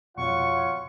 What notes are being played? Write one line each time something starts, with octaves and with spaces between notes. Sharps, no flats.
F2 B2 B3 F4 C#5 F#5 C#6